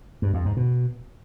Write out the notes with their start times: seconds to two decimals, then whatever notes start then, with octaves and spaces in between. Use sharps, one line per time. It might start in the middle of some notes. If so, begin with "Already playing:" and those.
0.22 G2
0.34 F2
0.45 G#2
0.57 B2